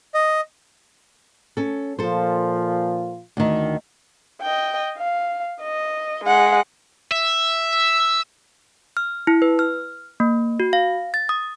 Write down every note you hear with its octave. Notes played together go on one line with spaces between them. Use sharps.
D#5
C#4 A4
A#2 F3 F4 A4 C5
D2 D#3
D#5 G5
F5
D#5
G#3 F#5
E5
F6
E4
B4
F6
A#3
F#4
F5
A6
D#6